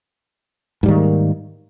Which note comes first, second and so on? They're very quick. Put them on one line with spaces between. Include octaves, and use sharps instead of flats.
G#2 G3 D#3 A#3